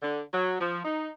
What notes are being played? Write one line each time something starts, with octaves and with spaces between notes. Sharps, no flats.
D3
F#3
F3
D#4